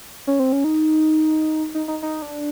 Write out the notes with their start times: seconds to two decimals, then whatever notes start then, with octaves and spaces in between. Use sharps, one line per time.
0.27 C#4
0.39 C4
0.52 C#4
0.64 D#4
1.75 D#4
1.88 D#4
2.02 D#4
2.22 D4